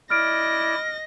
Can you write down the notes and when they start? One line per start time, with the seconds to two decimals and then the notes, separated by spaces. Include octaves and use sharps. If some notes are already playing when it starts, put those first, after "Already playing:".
0.10 E4 D5 D#5 F6 A#6 D7